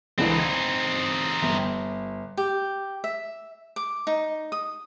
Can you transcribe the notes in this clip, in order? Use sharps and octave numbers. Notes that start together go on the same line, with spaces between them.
C#2 D3 E3 C4 D#4
G#6
G1
G4
E5
D6
D#4
D#6